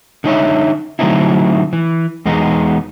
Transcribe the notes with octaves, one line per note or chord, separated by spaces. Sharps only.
D3 D#4 C#5 E5
D3 F#3 A3 C4 D#4 E4
E3
E2 G#3 B3 D#4